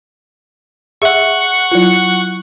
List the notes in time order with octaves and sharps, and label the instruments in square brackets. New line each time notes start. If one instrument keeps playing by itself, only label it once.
[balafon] G#4 E5 [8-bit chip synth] F#5 C#6
[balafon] F#3 E4 F4